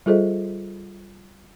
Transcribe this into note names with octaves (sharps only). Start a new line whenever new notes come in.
G3 F4 G#4 A4 C5 D#5